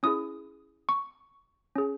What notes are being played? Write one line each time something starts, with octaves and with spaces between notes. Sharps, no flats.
C#4 E4 G#4 D#6
C#6
C#4 G#4